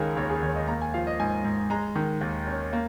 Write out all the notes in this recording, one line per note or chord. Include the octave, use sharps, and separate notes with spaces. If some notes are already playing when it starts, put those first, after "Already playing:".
Already playing: C#2 D#3 C#4 G#4 A#4
D#2 C#5
G#4
D#2 C#5
D#5
A#3 A#5
G#5
F3 F5
D#5
G#2 G#5
G#2
G#3 A#5
D#3
D#2
C#4
A#3